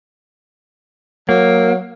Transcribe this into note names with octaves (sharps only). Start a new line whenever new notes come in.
F#3 A#3